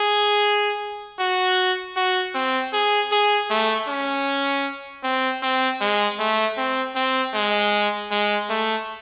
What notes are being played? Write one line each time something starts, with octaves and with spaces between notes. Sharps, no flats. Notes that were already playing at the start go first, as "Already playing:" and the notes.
Already playing: G#4
F#4
F#4
C4
G#4
G#4
A3
C#4
C4
C4
G#3
A3
C4
C4
G#3
G#3
A3